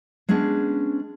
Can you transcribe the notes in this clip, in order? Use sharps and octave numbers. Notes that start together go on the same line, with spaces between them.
G#3 B3 C#4 D4 G#4